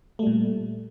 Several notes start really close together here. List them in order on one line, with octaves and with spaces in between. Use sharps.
A3 G3 A#2